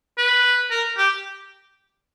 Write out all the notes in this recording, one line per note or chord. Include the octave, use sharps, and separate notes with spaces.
B4
A#4
G4